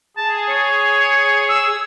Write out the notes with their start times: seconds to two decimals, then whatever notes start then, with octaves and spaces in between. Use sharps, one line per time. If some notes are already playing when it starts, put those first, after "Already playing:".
0.17 G#4 A5
0.49 C#5
1.49 E6